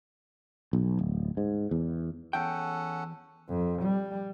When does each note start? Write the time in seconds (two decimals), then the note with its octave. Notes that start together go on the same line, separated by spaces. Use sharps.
0.73 B1
0.99 D1
1.37 G#2
1.71 E2
2.33 E2 C#4 A4 F#5 G5
3.49 F2
3.82 G3